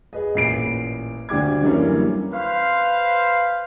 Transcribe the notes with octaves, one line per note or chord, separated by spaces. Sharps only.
G#4 B4 D#5
A1 A#2 C7 D7
D2 D4 G4 D6 G#6
F#2 D3 E3 G3 A#3 C#4
B4 C5 F5